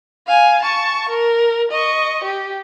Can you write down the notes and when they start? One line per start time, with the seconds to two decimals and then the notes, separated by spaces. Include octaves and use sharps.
0.27 F5 G#5
0.62 A5 C#6
1.08 A#4
1.71 D#5 C#6
2.23 G4